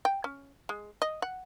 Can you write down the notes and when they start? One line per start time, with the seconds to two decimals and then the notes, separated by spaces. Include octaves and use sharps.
0.05 G5
0.24 C#4
0.69 G#3
1.02 D#5
1.22 F#5